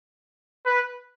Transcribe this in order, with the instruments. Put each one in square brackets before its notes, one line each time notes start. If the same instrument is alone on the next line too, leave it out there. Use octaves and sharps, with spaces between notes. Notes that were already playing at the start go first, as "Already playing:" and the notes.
[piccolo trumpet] B4